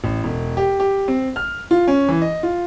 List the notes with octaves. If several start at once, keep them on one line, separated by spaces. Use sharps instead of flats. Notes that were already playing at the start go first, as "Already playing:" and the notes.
A1
E1
G4
G4
C4
F6
F4
C#4
E3
D#5
F4